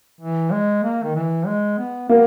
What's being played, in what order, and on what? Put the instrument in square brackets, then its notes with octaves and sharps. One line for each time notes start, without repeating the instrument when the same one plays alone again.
[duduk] E3
G#3
A#3
D#3
E3
G#3
B3
[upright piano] A#3 [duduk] B3